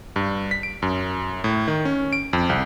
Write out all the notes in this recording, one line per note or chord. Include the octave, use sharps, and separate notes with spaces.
G2
B6
D7
F#2
A2
D#3
C#4
D7
F2
C2